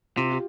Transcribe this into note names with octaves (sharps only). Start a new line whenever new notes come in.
C3 F4
G4